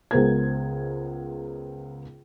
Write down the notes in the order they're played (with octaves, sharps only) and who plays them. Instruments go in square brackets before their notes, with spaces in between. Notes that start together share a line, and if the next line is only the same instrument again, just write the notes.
[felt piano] C#2 G#3 B3 A#4 C5 G#6